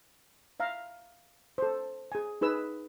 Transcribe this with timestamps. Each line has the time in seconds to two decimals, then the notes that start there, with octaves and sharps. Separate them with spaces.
0.60 E5 F5 A#5
1.58 A4 C5
2.12 G#4 G#5
2.41 D#4 G#4 B4 E6